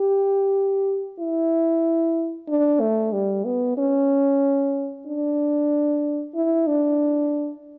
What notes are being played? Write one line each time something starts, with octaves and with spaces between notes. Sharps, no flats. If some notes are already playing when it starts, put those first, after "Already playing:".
Already playing: G4
E4
D4
A3
G3
B3
C#4
D4
E4
D4